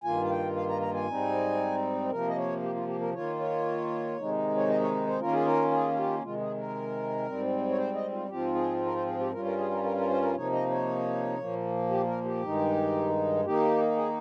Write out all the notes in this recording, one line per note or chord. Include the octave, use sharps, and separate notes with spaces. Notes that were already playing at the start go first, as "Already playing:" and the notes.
G2 D#3 A#3 F4 G#5
F5
G5
F5
A#5
A#5
G#5
G#2 G3 C4 D#4
C3 F3 A#3 A#4
D#5
C#5
G4
F4
G4
A#4
D#3 A#3 F4 C#5
C#5
C3 D#3 G#3 D#4
C#5
D#5
C#5
C5
D#3 A#3 C#4 F4 A#4
G#4
A#4
G#4
G#4
G4
C3 D#3 G#3 F4
G#4
A#4
G#2 G3 C4
C#5
C5
D#5
F4
G#2 F3 C4 F4 G4
G#4
A#4
C5
G#4
G4
G2 G3 C#4 F4 A#4
A#4
G#4
A#4
A#4
A#4
C5
A#4
C3 F3 A#3 D#4 C#5
D#5
C#5
A#2 F3 A#3
G4
A#4
G4
G2 D#3 G#3 D#4
D#3 A#3 D#4 G4
G#4